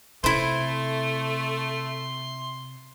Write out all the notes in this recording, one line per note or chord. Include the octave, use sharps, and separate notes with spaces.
C3 A3 E4 C5 C6